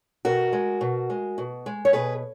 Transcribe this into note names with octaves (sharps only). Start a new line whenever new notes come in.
B2 F#4 A#4
G#3
B2
G#3
B2
G#3
C#5
B2 G#4 B4